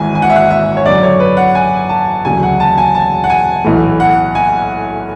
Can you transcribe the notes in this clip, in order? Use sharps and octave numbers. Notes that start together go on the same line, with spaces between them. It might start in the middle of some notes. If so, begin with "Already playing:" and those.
Already playing: G#1 G#2 E3 G#5
G#5
F#5
E5
F#5
E5
C#5
F#2 D3 F#3 D5
C#5
B4
F#5
G#5
A5
E1 D2 C#3 F#3 G#5
F#5
A5
G#5
A5
F#5
G#5
B1 A2 E3 A3
F#5
G#5